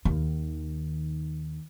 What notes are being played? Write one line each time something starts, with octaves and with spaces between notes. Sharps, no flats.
D#2 D#3